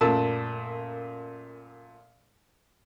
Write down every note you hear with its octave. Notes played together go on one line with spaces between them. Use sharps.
F#2 A#2 A3 A5 E6